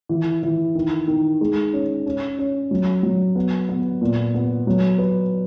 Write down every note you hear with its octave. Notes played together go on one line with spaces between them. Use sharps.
E3
E3
D#3
D#3
G#3
C#4
C#4
C#4
F#3
F#3
B3
B3
A#2
B3
F#3
B4